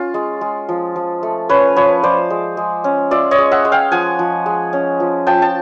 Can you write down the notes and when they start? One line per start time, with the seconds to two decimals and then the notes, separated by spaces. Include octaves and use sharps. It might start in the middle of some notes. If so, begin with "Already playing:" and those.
Already playing: C#4 F4
0.14 G#3
0.41 G#3
0.69 F3
0.96 F3
1.23 A3
1.49 C#4 B4 C#5
1.76 F3 B4 C#5
2.03 F3 C5 D5
2.30 G#3
2.57 G#3
2.84 C#4
3.11 F4 D5 E5
3.31 C#5 D#5
3.38 G#3
3.51 E5 F#5
3.65 G#3
3.72 F5 G5
3.92 F3 F#5 G#5
4.19 F3
4.46 G#3
4.73 C#4
5.00 F3
5.27 F3 G5 A5
5.42 A5